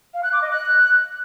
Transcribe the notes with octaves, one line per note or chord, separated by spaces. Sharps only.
F5
F#6
D6
D#5
F#6